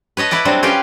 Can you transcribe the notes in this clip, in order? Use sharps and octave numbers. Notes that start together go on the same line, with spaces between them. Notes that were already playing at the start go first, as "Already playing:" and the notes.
B4 C#5 D#5 A5
E4 B4 D5 F#5
F#3 G3 C4 D4 F#4
C#4 F4 G4 B4 F5 G5